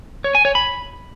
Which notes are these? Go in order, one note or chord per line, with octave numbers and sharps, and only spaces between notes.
C#5
G#5
C#5
B5